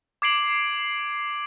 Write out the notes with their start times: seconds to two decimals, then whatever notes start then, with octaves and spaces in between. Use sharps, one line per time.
0.22 D6 G#6 C7 D7 F#7